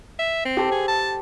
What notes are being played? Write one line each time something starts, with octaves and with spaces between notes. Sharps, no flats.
E5
C4
G4 A4 C5
G#4
A5